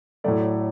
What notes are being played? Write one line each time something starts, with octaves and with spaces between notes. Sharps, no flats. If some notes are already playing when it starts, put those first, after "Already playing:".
A2 F#3 A3 D5